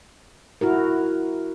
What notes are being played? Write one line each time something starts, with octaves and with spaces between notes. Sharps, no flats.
E4 F#4 A#4